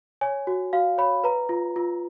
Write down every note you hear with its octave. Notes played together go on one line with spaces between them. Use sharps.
C#5 G#5
F#4
F#4 F5
C#5 B5
B4 A#5
F4
F4